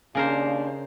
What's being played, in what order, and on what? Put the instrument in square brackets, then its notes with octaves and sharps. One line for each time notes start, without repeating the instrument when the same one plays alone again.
[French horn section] D#2 A#3 D4 [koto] C#3 A#4 C5